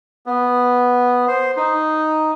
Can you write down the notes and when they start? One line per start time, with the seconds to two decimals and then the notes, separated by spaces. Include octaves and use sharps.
0.26 B3
1.28 C5
1.57 D#4